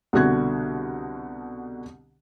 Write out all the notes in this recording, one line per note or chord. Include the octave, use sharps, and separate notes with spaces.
C2 B2 D3 F#4 F#6 G#6